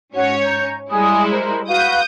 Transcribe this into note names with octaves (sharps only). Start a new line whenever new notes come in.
G#2 C#4 F#4 C#5
A#5 G6
G3 G#3 E4 G#5 D#6
A#4 C5 A#5
F#4 B4 F5 D#6 G6